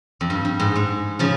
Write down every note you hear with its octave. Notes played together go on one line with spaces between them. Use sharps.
F2
G2
G2
G#2
G#2
C#3 F3